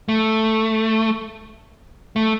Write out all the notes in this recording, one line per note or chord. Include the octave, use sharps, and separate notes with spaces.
A3
A3